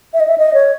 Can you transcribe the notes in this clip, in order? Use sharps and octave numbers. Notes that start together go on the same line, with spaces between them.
E5
D#5
E5
D#5
C#5